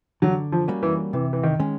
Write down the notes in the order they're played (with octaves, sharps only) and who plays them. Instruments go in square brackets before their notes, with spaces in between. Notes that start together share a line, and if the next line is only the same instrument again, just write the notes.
[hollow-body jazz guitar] D3 [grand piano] F#3
[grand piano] F3
[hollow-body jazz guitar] G3 A#3 C#4 F#4
[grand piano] E3
[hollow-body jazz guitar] C3 [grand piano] E3
[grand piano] E3
D#3
[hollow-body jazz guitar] D#3 G#3 C#4